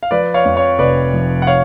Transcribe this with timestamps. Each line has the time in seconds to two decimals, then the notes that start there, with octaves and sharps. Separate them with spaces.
0.03 F5
0.11 F3 B4 D5
0.34 C#5 F5
0.45 F2
0.56 C#5 F5
0.79 F1 B4 D5
1.13 F3
1.42 F#5
1.47 C#5 F5